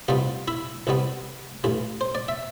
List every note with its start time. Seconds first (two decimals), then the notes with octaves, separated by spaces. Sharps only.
0.08 C2 C3 G3 B3 F4 F5
0.48 E4 E5
0.87 C2 C3 G3 B3
1.64 A1 G2 E3
2.01 C5
2.15 D5
2.28 E5